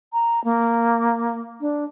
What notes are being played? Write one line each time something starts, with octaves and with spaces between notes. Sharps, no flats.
A#5
A#3
D4